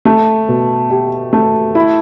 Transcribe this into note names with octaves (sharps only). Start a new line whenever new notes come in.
A3
B2
G4
A3
E4